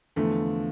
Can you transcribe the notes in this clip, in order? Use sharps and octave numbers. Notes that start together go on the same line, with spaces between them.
E2 D3 F3 A3